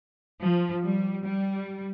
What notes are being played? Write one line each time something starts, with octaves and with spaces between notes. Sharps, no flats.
F3
G3
G3